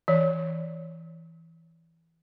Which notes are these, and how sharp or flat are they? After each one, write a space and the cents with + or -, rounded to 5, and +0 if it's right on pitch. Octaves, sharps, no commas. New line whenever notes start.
E3 +0 C#5 +0